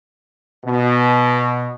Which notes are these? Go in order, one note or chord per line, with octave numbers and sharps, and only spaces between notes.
B2